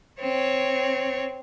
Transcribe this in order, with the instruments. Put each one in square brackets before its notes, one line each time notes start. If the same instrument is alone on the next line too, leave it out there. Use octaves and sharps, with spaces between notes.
[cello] C4 C#5